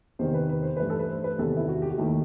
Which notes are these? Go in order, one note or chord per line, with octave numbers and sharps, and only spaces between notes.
E2 C3 D#3 C5
B4
B4
C5
G2 E3 A3 B4
A4
B4
C5
B4
E2 C3 D#3 G3 A4
E4
F#4
G4
F#4
D#2 D#3 A3 E4